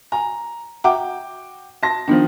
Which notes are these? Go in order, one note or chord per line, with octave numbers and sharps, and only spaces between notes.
G#5 A#5
F#4 E5 F#5 G5 A#5 D6
A5 C6 A#6
D#3 F3 B3 D4